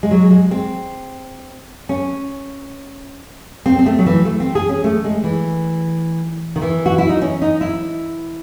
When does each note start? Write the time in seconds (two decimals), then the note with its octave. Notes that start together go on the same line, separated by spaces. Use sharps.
0.03 G#3
0.11 F#3
0.31 G#3
0.51 C4
1.89 C#4
3.66 C4
3.79 C4
3.86 A3
3.99 F#3
4.06 E3
4.25 A3
4.40 C4
4.55 G#4
4.69 C#4
4.84 A3
5.05 G#3
5.24 E3
6.56 D#3
6.62 E3
6.86 F#4
6.98 E4
7.09 D#4
7.22 C#4
7.42 D#4
7.61 E4